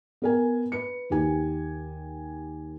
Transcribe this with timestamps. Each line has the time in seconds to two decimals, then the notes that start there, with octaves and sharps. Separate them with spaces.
0.22 B3 A#4 G#5
0.72 B4 C#7
1.10 D#2 D#3 G4 G#5